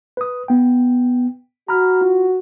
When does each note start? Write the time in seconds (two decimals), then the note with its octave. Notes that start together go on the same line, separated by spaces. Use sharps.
0.17 B4 D#6
0.48 B3 G5
1.68 F#4 A#5 B5 F6
2.01 F4